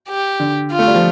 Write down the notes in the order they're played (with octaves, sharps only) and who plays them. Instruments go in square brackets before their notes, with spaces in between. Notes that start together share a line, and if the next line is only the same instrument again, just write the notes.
[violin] G4
[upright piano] D3
[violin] F4
[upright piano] A3
G3
F3